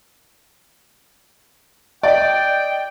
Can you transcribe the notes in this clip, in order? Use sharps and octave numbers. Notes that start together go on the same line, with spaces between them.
D5 D#5 G5